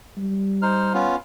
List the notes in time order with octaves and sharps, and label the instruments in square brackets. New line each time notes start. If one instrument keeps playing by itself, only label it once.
[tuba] G3
[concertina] D#4 C5 F6
B3 C#4 F4